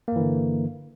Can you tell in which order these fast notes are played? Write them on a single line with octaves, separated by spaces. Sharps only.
A#3 G2 E3 D3